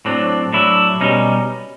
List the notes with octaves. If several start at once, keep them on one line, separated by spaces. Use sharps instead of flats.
A2 F#3 C4 D4
A2 F#3 D4 E4
B2 G3 C#4 D#4